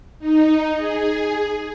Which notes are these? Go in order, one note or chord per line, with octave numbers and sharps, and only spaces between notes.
D#4
G#4